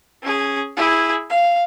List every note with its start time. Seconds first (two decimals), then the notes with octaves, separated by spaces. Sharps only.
0.22 C#4 G#4
0.76 E4 G#4
1.30 F5